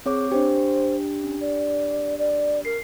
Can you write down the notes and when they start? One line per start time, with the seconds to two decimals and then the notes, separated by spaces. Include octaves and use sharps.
0.06 C4 G#4 C#5 D6
0.31 D4 G4 C5
1.22 C#4
1.41 D5
2.18 D5
2.65 A#4 C7